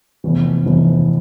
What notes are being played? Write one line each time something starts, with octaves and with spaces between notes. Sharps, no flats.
F1 E2 E3
F1 E2 E3